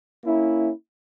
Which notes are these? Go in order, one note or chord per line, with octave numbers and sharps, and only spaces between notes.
A#3 C#4 E4